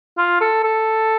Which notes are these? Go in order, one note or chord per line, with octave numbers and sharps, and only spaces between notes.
F4
A4
A4